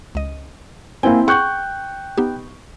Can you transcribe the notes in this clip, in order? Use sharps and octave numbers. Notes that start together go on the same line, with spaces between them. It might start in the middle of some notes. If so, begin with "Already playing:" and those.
C#2 D#5
A#3 C4 E4 C5 G5 G#5
G#4 F#5 G5 C#6 F#6 G6
B3 D#4 G4